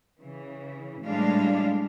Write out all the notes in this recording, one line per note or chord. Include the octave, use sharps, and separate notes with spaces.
C#3 E3
A2 E3 G3 G#3 D4 F5